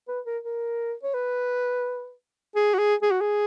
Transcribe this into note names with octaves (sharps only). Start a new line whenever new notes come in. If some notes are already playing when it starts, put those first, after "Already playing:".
B4
A#4
A#4
C#5
B4
G#4
F#4
G#4
G#4
F#4
G#4